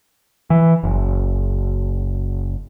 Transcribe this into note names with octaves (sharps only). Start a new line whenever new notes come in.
E3
F#1